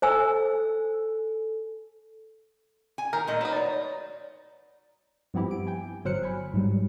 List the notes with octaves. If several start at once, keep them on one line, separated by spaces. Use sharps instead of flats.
A4 C5 G#5 E6
G#5
D#3 A#4
A#2 A3 D#5
F#3 D#4 B4
C#5 D5
G2 F3 B3 C4 E4 G4
D7
G5 G#5
G1 F#3 C5 F6 F#6 C#7
G#5 B5
G#2 F#3 G3